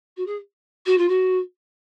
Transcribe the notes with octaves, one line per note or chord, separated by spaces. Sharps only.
F#4
G#4
F#4
F4
F#4